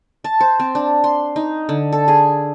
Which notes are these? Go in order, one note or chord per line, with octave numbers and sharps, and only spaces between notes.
A5
C5
C4
D4
C6
D#4
D3
A4
G#4